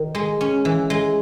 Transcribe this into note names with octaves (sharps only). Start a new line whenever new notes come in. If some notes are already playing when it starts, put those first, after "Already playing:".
Already playing: D#3
G#3
C#4
E3
G#3